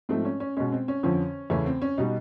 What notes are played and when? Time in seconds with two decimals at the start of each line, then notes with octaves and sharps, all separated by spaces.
0.09 G#2 F3 A3 C4
0.25 C#4
0.40 C#4
0.57 B2 G#3 C#4
0.72 C4
0.88 C#4
1.03 F2 D3 F3 C#4
1.50 E2 C#3 E3 A3 C#4
1.66 C4
1.82 C#4
1.98 B2 G3 D#4